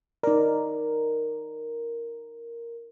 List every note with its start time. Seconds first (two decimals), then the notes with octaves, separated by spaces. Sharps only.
0.23 D#4 A#4 D5